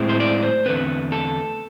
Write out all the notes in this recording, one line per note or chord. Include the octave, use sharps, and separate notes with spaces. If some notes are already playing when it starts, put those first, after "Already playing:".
Already playing: A2 G#3 C4 E4
C5
D5
C5
E2 D3 A3 C4 B4
A4